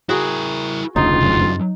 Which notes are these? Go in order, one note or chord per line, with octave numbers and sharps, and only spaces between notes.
E4 F#4 G#4 A#4
F1 D2 C#3 D#4 F4
C#2 F#2